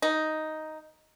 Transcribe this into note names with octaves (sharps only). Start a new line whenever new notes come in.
D#4